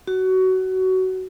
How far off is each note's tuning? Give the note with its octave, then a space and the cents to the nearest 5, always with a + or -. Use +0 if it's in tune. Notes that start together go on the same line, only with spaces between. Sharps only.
F#4 +20